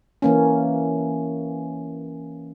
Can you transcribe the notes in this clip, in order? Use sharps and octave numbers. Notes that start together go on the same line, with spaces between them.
E3 A#3 C#4